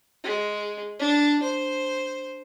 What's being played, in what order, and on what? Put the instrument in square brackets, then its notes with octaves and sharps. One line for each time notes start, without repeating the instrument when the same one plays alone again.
[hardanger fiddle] G#3
D4
C5